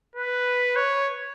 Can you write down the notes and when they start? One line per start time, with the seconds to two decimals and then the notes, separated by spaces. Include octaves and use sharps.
0.15 B4
0.76 C#5